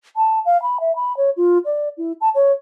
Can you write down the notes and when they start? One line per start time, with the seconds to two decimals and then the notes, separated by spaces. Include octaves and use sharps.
0.16 A5
0.46 F5
0.62 B5
0.80 E5
0.96 B5
1.17 C#5
1.37 F4
1.65 D5
1.98 E4
2.21 A5
2.35 C#5